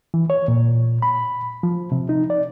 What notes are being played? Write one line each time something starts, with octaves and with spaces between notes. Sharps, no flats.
E3
C#5
A#2
B5
F3
C3
D#4
D5